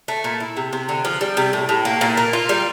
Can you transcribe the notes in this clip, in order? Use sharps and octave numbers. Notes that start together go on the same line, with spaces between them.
A3
A#2
E4
C3
C3
D3
F3
G3
C3
A2
A2
A#3
A#2
A#3
F4
G3